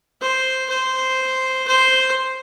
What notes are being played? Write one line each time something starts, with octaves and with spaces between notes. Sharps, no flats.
C5
C5
C5